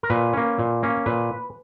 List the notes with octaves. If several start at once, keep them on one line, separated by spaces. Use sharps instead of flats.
A#4
A#2 B4
A#3 C#4
A#2
A#3 C#4
A#2 B4